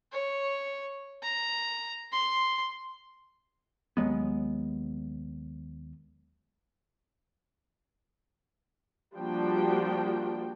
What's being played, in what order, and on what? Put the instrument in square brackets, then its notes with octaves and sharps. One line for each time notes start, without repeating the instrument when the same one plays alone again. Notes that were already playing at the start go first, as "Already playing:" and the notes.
[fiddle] C#5
A#5
C6
[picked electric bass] D#2 F#3 G#3 B3
[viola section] F3 G3 A#3 D4 F#4 G5